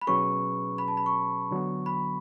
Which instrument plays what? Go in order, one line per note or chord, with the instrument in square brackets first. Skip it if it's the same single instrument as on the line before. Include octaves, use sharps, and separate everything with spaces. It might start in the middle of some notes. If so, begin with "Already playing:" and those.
[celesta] B5
[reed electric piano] B2 F#3 C#4 G#4 B4 [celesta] C#6
[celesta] B5
A5
B5
C#6
[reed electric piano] D3 F#3 B3
[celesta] B5